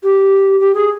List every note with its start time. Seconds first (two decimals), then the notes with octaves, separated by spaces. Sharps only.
0.03 G4
0.60 G4
0.75 G#4